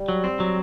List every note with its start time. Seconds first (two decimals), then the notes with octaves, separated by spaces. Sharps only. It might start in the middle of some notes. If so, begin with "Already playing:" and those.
Already playing: G3
0.09 F#3
0.24 C4
0.40 F#3